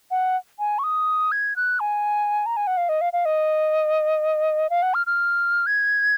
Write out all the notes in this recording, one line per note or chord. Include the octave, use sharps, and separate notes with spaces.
F#5
G#5
C#6
D#6
G#6
F#6
G#5
A#5
G#5
F#5
F5
D#5
F5
F5
D#5
F5
F#5
F6
F6
G#6